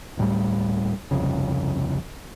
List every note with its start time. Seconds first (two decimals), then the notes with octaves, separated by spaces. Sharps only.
0.17 D1 A2 G3
1.11 G1 C2 F2 C#3